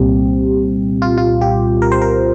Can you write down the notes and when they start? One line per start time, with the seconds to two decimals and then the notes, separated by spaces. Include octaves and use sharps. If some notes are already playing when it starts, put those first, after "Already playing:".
Already playing: C2 A#2 G3 C4 G4
1.02 F4
1.18 F4
1.41 G4
1.82 A#4
1.92 C5
2.02 A#4